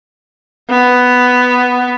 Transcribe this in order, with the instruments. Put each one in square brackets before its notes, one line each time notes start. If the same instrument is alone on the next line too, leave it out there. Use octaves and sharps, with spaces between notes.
[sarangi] B3